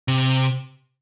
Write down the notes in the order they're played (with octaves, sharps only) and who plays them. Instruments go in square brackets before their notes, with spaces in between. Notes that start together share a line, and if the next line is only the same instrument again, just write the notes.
[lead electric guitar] C3